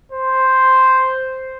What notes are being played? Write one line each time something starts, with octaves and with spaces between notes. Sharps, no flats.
C5